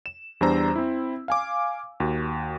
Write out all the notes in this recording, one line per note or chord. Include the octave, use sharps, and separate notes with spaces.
E7
E2 G3 D4 C5 A#5 E6
C4 E4
F5 G#5 D6
D#2 F#4